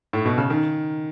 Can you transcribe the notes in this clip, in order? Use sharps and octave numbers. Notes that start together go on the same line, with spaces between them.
A2
B2
C#3
D#3